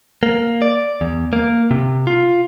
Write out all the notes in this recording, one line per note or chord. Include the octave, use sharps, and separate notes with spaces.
A#3
D5
E2
A#3
C3
F4